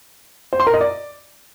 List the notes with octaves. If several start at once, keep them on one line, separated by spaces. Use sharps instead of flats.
C5
C6
A#4
D#5
D5